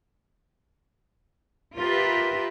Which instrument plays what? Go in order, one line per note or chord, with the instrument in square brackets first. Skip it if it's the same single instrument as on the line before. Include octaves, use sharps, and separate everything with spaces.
[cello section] F4 G4 A#4 B4 E5